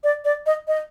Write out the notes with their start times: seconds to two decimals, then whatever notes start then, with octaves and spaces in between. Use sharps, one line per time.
0.04 D5
0.25 D5
0.46 D#5
0.68 D#5